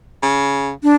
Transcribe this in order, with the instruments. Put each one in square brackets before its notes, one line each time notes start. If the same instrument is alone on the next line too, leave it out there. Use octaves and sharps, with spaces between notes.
[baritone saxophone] C#3
[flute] D4